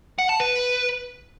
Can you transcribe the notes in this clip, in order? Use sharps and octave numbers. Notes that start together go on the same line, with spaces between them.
F#5
A5
B4